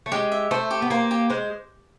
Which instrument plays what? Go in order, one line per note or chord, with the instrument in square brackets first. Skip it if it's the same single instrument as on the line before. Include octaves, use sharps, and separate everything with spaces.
[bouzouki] A3
[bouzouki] G#3 [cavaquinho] G4
[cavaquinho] E5
[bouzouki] A3 [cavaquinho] C5
[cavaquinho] G4
[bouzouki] B3
[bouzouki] A#3 [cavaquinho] C5
[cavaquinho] G4
[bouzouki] G#3 [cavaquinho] C5